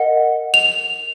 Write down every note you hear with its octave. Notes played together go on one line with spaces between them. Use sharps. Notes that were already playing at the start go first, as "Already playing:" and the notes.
Already playing: A#4 D#5 F#5
F7